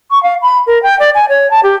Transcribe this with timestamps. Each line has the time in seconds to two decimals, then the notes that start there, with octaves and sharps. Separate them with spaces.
0.11 C#6
0.23 F5
0.42 B5
0.67 A#4
0.83 G5
0.99 D5
1.15 G#5
1.29 C#5
1.51 A5
1.63 G4